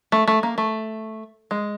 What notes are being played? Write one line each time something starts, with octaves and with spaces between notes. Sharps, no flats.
A3
A3
A#3
A3
G#3